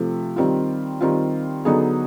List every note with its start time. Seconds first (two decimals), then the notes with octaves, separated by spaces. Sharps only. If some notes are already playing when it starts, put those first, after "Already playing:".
Already playing: C3 F3 A3
0.36 D#3 G3 C4 F4
1.01 D#3 G3 C4 F4
1.65 D3 F#3 B3 D#4 G#4